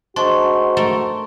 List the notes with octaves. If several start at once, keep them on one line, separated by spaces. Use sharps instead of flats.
G#2 D4 F#4 C6 C#6
A3 A4 A#4